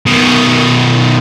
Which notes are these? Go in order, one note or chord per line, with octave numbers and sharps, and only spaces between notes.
B2 D#3